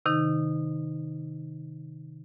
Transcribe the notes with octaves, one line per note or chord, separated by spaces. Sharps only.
C3 D#3 D#4